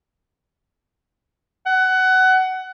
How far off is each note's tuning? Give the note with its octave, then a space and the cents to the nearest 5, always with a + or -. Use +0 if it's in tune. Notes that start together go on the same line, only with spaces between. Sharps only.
F#5 +20